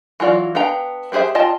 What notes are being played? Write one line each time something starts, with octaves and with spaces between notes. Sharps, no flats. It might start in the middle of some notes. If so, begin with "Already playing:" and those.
E3 F#3 F4 D5
B3 D4 F5 G5 A#5
B3 G4 G#4 C5 E5
F4 D#5 G5 A5